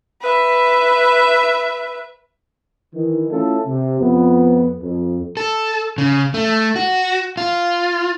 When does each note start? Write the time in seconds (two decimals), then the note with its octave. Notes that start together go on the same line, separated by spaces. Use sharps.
0.22 B4 E5
2.94 D#3 E3
3.31 A3 C#4 E4 F4 A4
3.67 C3
4.00 F2 B3
4.82 F2
5.37 A4
5.98 C#3
6.34 A3
6.76 F#4
7.37 F4